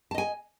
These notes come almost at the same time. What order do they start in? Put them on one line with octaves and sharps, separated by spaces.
A5 D#5 G#5